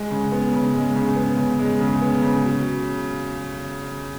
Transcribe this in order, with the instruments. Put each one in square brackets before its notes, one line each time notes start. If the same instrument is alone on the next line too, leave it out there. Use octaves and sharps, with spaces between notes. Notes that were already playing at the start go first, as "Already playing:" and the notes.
Already playing: [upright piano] G#3
C#3
B3
C#3
G#3
C#3
B3
C#3
G#3
C#3
B3
C#3
F#3